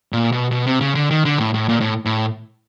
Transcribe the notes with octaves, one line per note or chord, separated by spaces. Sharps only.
A#2
B2
B2
C3
C#3
D3
D#3
D3
A2
A2
A#2
A2
A2